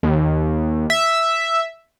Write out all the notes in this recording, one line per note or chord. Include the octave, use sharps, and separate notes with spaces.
D#2
E5